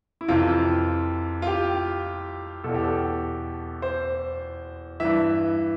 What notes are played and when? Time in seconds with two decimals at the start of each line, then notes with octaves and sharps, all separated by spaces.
0.21 E4
0.28 F2 C3 E3 F4
1.42 F4
1.47 G4
2.64 E2 B2 A4
2.74 G4
2.84 A4
3.82 C5
5.00 G2 E3 E5